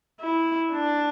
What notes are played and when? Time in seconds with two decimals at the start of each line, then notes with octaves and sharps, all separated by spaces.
0.21 E4
0.72 D4